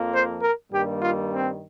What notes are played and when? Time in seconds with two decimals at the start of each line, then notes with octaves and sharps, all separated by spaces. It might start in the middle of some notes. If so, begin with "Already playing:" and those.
Already playing: F2 F3 A#3
0.12 C5
0.41 A#4
0.71 G2 D#3 G3 A#3 G4
1.01 F4
1.30 C4